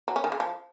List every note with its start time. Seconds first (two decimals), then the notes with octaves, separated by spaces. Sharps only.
0.08 F#3
0.16 C#4
0.24 D#3
0.32 C#3
0.40 F3